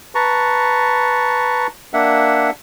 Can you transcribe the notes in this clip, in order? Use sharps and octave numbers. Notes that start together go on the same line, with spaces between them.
B4 A5 A#5 C#6
A#3 D4 E5 F#5